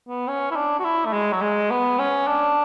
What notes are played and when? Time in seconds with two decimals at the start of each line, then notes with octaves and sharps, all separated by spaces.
0.09 B3
0.28 C#4
0.51 E4
0.56 D4
0.80 F#4
0.85 E4
1.06 A3
1.13 G#3
1.32 F#3
1.42 G#3
1.71 B3
1.99 C#4
2.27 D4